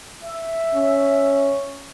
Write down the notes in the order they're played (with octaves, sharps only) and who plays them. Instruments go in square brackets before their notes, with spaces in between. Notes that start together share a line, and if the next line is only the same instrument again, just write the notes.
[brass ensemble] E5
[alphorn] C#4